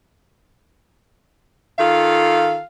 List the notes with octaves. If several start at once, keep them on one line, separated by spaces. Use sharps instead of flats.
D#3 F4 A4 F5